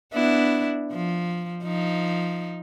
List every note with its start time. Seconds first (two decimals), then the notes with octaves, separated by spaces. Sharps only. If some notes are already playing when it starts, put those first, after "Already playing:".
0.14 B3 D4 E4
0.92 F3
1.63 F3 D#4